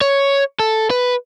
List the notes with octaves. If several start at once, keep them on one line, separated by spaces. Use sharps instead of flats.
C#5
A4
B4